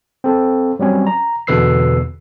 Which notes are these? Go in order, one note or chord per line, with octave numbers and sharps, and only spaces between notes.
C4 A4
F#3 G3 C4 C#4
A#5
E2 B2 D3 B4 E6 C7